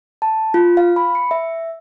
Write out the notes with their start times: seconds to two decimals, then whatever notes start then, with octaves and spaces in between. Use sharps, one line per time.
0.22 A5
0.54 F4
0.77 F5
0.96 B5
1.15 C#7
1.31 E5